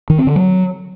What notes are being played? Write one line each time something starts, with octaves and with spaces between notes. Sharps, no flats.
D#3
C4
D3
F#3